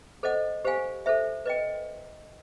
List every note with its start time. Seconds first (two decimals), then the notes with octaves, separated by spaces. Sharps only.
0.23 A4 C5 D#5 F#5
0.65 G4 C5 F5 G#5
1.06 A4 C5 E5
1.46 B4 D#5 G5